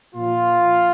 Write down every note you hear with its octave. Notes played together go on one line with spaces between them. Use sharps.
A#2 F3 F4